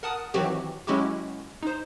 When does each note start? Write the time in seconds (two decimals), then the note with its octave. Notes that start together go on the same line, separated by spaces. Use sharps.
0.03 A#4 F#5 A5 D#6
0.34 D#3 E3 F#3 C4 F#4 G4
0.87 F#3 G#3 C#4 E4 F#4 G4
1.63 D#4 C5